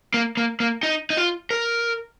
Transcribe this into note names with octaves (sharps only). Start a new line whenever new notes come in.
A#3
A#3
A#3
D#4
D#4
F4
A#4